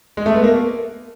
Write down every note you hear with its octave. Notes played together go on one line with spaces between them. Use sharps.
G#3
A3
B3
A#3